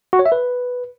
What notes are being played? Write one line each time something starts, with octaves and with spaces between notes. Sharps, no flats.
F#4
C#5
E5
B4